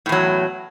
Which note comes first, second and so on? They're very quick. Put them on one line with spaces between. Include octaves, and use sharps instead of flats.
A2 E2 F#3